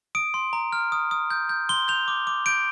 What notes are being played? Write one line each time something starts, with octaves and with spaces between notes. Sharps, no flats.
D#6 D7
C6
A#5
F6
D#6
D#6
G6
G6
C6 G7
G6 F7
D6
D6
G6 D7